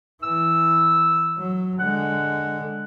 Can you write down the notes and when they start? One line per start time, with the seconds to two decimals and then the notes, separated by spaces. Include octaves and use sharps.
0.23 E3 E6
1.38 F#3
1.79 D3 G#3 F#5